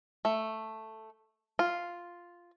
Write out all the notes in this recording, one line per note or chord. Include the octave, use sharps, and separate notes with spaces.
A3
F4